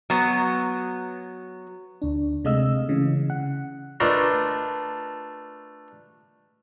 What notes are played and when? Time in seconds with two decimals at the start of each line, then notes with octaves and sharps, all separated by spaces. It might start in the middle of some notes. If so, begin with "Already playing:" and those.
0.10 F#3 B3
2.02 D2 D4
2.44 C3 G#3 A3 D#5 F5 E6
2.89 C#3 E3
3.30 F#5
4.00 A3 D4 F4 A#4 B4 D#5